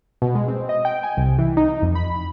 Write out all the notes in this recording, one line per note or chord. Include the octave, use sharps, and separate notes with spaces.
B2
G#3
C4
D#5
G5
G#5
C2
E3
D#4
F2
B5